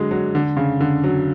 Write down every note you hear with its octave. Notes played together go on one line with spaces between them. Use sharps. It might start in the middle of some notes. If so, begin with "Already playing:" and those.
Already playing: D3 F#3 G#3
F#3
D3
C#3
D3
F#3